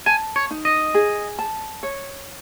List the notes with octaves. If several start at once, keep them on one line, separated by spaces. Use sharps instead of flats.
G#5 A5
C#5
D#4
D#5
G#4
A5
C#5